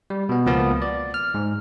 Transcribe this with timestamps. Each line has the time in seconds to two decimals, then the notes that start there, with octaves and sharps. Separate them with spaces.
0.10 G3
0.29 B2 B3
0.46 C#2 F3 A#3 B3
0.82 D5
1.14 F6
1.34 G#2